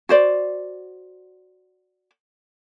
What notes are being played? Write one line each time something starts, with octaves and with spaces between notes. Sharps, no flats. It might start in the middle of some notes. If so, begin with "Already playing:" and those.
F#4 C5 D5